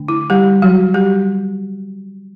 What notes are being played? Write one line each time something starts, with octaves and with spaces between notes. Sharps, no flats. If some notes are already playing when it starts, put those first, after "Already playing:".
Already playing: D3 A3 D4
E4
G3 G4
F#3 F#4
G3 G4